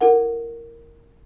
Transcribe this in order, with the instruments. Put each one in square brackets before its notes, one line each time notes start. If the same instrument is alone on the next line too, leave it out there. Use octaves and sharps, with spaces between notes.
[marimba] E4 A4 A#4 F#5